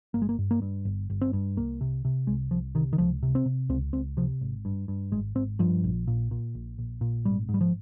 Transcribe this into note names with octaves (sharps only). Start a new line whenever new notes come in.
G1 A#3
G#3
A#3
G2
A#3
G2
G1
G1
C4
G2
C2 A#3
C3
C3
C2 G#3
C2 F3
C3 D#3
D#3
C#2 F3
C3
C4
C3
C#2 C4
C#2 C4
C3 F3
G#1
G2
G2
G#1 G#3
G#1 C4
G2 F3
A#1
A#2
A#2
A#1
A#1
A#2
G#1 G3
G#2
G3
F3